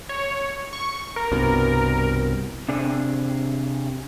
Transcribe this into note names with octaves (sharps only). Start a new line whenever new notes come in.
C#5
C#6
A#4
C2 G2 B2
C3 D4 G#4